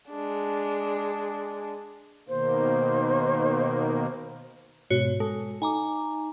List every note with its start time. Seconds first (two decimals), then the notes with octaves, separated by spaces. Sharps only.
0.11 G#3 D4
2.29 B2 D#3 A#3 C5
4.90 G#2 B2 F#4 C#5
5.20 G#3 A4
5.62 D#4 G#5 A#5 D6